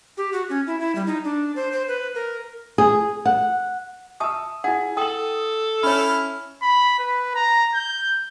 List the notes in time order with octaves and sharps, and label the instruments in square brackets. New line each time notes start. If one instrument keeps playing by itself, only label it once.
[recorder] G4
F#4
C#4
E4
E4
G3
D#4
D4
C5
C5
B4
A#4
[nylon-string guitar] G#4
F#5
[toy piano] E5 A5 D#6 [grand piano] C#6 E6
[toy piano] E4 F#5 [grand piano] G#4
[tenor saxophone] A4 [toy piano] G5 [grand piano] D#6 F#7
[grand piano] C#4 [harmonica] E4 F6 [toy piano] C#5 B5
[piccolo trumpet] B5
B4
A#5
G6